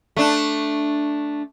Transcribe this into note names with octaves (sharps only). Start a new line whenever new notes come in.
A3 D4